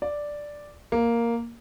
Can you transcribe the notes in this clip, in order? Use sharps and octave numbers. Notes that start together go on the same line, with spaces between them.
D5
A#3